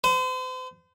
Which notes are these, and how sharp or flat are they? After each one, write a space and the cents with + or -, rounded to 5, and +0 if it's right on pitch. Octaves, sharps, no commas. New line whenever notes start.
C5 -40